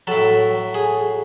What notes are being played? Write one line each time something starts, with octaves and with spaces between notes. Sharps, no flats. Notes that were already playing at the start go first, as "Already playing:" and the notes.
A2 F#3 A4
G#4